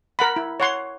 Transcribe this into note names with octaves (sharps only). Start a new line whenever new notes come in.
A#4 F#5 B5
E4
C#5 F#5 C6